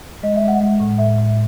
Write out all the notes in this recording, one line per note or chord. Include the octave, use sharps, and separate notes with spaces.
G#3 D#5
E5
G#3
F#5
G#3
A2
A2 E5
A2